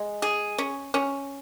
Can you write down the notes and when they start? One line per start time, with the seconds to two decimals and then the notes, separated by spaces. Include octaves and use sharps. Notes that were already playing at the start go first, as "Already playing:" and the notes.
Already playing: G#3
0.22 G#4
0.58 C#4
0.94 C#4